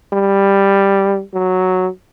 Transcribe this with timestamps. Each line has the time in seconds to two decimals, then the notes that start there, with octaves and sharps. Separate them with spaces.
0.13 G3
1.33 F#3